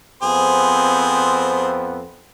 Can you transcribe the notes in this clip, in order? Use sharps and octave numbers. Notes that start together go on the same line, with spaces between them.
F2 B3 C4 G#4 C5